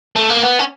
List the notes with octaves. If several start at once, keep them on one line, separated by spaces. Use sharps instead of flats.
A3
A#3
B3
C#4